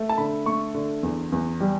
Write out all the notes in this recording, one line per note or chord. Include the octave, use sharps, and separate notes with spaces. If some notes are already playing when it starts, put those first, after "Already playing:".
Already playing: A3
A5
D3 B5
A3 C#6
D3
E2
E2
G3